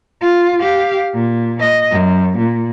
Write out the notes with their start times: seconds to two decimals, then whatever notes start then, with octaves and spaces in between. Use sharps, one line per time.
0.22 F4
0.60 G4 F5
1.14 A#2
1.60 D#5
1.91 F#2
2.38 A#2